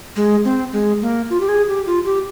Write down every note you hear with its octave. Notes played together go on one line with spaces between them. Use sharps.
G#3
C4
G#3
A#3
F4
G4
G#4
G4
F4
G4